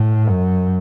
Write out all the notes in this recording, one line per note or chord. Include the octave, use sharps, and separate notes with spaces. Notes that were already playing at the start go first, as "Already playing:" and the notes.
Already playing: A2
F#2